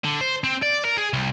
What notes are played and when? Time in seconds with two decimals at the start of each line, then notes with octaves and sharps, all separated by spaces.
0.04 D3
0.21 C5
0.44 C4
0.62 D5
0.85 A#4
0.98 G#4
1.13 C2